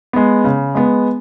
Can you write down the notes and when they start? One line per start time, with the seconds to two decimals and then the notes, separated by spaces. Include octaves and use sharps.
0.13 G#3 B3
0.44 C#3
0.75 G#3 B3